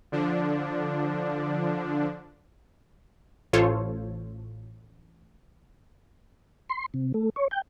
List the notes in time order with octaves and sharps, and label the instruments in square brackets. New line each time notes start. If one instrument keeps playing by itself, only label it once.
[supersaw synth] D3 F3 D4
[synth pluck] A1 F4 A4 C5 C#5
[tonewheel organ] C6
C3
A3
C#5
G5